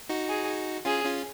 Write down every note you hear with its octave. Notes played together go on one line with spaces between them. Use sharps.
D#4 F#4
G#4
C#4 F4 G#4
C#4 F4